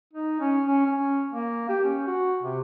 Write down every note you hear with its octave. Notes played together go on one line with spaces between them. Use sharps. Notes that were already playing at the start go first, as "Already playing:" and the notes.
D#4
C#4
C#4
C#4
A#3
G4
C#4
F#4
C3